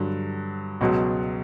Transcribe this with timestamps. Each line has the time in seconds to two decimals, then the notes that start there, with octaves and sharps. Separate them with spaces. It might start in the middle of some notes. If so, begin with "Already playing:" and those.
Already playing: G2 D3 F#3
0.81 C#2 B2 F#3